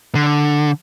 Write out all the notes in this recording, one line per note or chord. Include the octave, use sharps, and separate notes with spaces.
D3